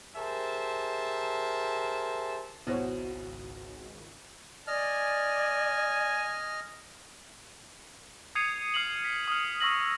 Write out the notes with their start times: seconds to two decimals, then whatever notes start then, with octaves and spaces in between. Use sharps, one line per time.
0.16 G4 G#4 A#4 C5 E5 A5
2.67 G#1 C#2 B2 E4 F#4 C5 C#5
4.67 D5 D#5 G#5 F6
8.35 D#6 G#6 C7 C#7 D#7 F7
8.74 D#6 F6 C7 F7 F#7
9.05 B6
9.28 D#6 F6
9.60 C#6 D#6 E6 A#6 F#7